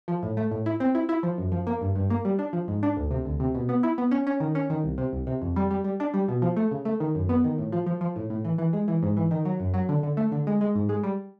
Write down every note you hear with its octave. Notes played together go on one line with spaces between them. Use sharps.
F3
A2
A3
A2
E4
C4
E4
E4
F3
F#2
F3
A#3
G2
G2
A#3
G3
D4
F3
G#2
D4
D2
C3
D2
C3
B2
B3
E4
B3
C#4
C#4
D#3
C#4
D#3
C2
C3
C2
C3
F2
G3
G3
G3
D4
G3
B2
F3
A3
C#3
A3
D#3
F#2
B3
D#3
A2
F3
F3
F3
A2
A2
E3
E3
G#3
E3
G#2
E3
D#3
F#3
F#2
F#3
D3
D3
A3
D3
G#3
G#3
G#2
G#3
G3